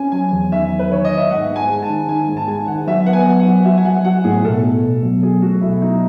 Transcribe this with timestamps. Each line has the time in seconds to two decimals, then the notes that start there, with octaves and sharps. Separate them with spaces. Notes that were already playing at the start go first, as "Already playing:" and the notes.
Already playing: C#4 G#5
0.12 F#3 G#5
0.32 E2
0.51 D#3 E5
0.71 F#3
0.79 B4
0.90 D#3 C#5
1.05 D#5
1.11 D#3
1.18 E5
1.30 G#2 F#5
1.50 G#2
1.56 G#5
1.69 G#3
1.82 A5
1.89 D#3
2.08 D#3 G#5
2.28 G#2
2.37 A5
2.48 G#3 G#5
2.67 D#3 F#5
2.87 F#3 E5
3.06 B3 F#5
3.13 G#5
3.26 F#3
3.40 F#5
3.46 F#3
3.65 F#4 E5
3.77 G#5
3.85 F#3 F#5
4.05 F#4 F#5
4.24 A2 G#4
4.44 B2 A4
4.63 A3
4.83 B2
5.03 F#3
5.23 F#3 G#4
5.42 A3 F#4
5.61 B2 E4
5.81 F#3 D#4